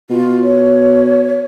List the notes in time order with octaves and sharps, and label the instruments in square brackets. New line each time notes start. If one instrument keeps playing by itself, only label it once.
[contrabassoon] B2 [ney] F4
[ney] C#5